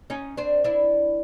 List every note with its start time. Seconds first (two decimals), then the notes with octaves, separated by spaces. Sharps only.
0.10 C#4 D#4
0.37 C4 D4
0.64 D4 E4